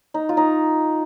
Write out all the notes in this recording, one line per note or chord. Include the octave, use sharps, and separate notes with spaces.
D#4
F4
D#4